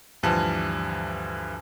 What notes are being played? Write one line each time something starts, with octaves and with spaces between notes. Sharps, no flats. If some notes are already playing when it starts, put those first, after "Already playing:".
D2 G2 E3 F3 A5